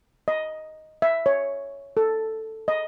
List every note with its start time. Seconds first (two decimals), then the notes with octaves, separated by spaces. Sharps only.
0.28 D#5
1.02 E5
1.26 C#5
1.97 A4
2.68 D#5